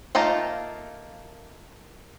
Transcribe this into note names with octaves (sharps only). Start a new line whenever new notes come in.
A3 A#3 D#4 F4